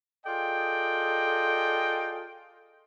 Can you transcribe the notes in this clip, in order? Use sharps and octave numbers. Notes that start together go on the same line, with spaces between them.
F4 G#4 A4 D5 D#5 G5